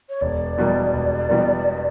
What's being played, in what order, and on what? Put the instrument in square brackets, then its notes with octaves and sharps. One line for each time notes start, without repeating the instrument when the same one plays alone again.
[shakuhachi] C#5
[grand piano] E1 [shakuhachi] D5
[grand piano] E2 B2 G3 A#3
E1
E2 B2 G3 A#3